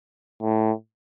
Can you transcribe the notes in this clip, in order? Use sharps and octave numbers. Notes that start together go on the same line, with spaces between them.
A2